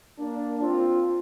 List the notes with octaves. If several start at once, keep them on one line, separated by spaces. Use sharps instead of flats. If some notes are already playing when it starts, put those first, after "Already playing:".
A#3 D4
C4 F4